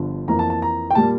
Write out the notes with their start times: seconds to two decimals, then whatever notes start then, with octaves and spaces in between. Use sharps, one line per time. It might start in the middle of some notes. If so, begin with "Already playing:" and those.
Already playing: G1 D3 F3
0.28 F2 E3 A#3 A#5
0.39 A5
0.50 A5
0.62 A#5
0.90 G5
0.95 A#2 G3 A#3 A5